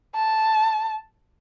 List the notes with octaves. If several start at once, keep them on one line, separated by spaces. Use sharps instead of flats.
A5